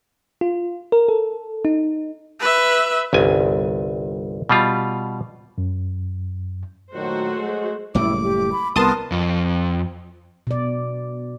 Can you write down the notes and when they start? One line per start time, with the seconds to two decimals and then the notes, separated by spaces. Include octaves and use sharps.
0.41 F4
0.92 A#4
1.09 A4
1.65 D#4
2.40 B4 E5
3.13 G1 C2 G#5
4.49 B2 G3 F4
5.58 F#2
6.92 A#2 D#3 F#3 A3 F#4 C5
7.35 F#3 G#3
7.95 F#1 A2 G3 E4 D6
8.23 G4
8.52 B5
8.76 C2 B3 A#4 A5 C6 D#6
9.12 F2
10.47 B2 D5